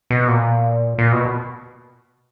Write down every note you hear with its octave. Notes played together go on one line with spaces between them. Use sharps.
B2
A#2
A#2
B2